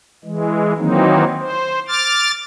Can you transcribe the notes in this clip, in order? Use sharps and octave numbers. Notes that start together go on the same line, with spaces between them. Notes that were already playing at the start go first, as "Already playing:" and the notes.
E3 G#3
D#3 E3 F#3 A#3 C4 D#4
C5
D6 F6 A6